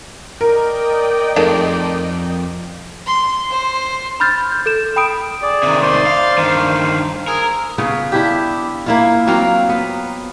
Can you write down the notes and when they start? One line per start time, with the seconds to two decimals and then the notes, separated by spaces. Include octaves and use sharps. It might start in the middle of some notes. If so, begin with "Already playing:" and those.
0.41 A#4 D5 D#5 G5
1.36 F2 D#3 G#3 A3
3.06 C6
3.51 C5
4.20 B5 C6 F6 G6 A6
4.52 G6
4.66 A4 G6 E7
4.96 G5 B5 D#6 D7
5.42 G#4 D5
5.63 C3 D#3
5.82 C5 D5 C6
6.06 F5
6.38 G2 D#3 C5 F5
7.27 G#4 A#4 G#5 E6
7.78 C#3 B3 F4
8.12 D4 E4 G4
8.86 A#3 E4 F4
9.27 F#3 A#3 C4 F4
9.69 B3